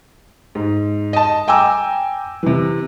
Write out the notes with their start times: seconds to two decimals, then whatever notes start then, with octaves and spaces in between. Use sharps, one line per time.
0.55 G#2
1.13 D#5 A5
1.48 G5 G#5 A#5 D6 E6
2.43 C3 E3